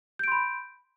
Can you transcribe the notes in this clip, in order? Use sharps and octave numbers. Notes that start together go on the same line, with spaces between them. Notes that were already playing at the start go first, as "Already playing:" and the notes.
B5 C6 G6 D7